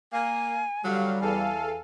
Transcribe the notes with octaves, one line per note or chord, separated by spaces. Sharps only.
A#3 G#5
D3 F#3 G3 F5
E2 A4 F5 G#5